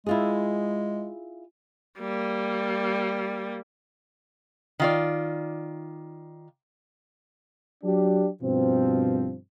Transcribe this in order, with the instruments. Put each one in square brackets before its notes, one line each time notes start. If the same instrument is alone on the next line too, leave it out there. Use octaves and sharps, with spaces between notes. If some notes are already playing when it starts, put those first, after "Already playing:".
[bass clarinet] G#3 [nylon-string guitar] E4 F4 G#4
[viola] G3 A#3
[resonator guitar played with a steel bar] D#3 F4 D5
[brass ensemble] F#3 D4 G4
G2 B2 F3 C4